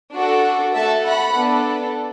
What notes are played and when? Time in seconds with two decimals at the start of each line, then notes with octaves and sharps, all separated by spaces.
0.13 D4 F#4 A4
0.75 A3 F#4 A4 E5 A5
1.05 F#5 B5
1.35 B3 D4 A4